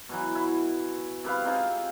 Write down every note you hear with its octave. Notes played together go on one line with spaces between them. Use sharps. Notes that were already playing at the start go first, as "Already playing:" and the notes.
B2 E3 F#3
E4
C3 B4 F5
C4 D#4 F4 G#4